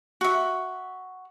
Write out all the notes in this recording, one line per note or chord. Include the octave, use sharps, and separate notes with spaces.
F#4 E5